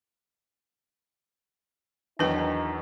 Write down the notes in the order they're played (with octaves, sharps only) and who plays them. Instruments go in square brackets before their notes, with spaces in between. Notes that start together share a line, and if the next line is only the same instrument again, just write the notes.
[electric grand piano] E2 D#3 F#3 [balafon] D4 B4 G5 [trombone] D#4